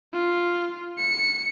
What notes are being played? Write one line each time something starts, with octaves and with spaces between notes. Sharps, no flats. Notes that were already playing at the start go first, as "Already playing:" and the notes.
F4
C#7